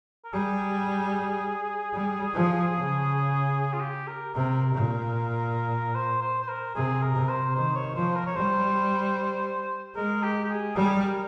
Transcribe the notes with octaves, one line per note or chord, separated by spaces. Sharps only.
A#4
G3 G#4
G3
F3
C#3
F4
G4
A#4
C3 A#4
A#2
C5
C5
C5
A#4
C3 G#4
A#4
C3
C5
D#3 C5
C#5
F3 C5
A#4
C#5
G3 C5
G#3 A#4
G4
G4
G#4
G3 A#4
G#4
A#4